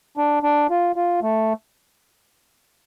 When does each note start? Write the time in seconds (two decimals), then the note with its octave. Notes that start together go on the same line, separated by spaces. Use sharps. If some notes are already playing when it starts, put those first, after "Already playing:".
0.17 D4
0.43 D4
0.70 F4
0.96 F4
1.23 A3